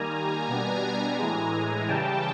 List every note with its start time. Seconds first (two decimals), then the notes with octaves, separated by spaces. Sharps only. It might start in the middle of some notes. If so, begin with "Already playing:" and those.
Already playing: D#3 G3 A#3 G#5 A#5
0.48 B2 G3 B3 D4
1.18 A2 E3 G#3
1.88 C#3 E3 G3 G5 A5